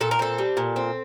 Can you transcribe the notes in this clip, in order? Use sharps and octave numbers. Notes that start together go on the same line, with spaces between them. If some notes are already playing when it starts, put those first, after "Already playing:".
A#2 A4
A#4
C4 A4
G3
A#2
C4